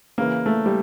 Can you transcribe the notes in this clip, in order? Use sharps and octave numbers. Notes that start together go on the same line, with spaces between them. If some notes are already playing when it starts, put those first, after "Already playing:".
C#3 E3 A#3
A3
G3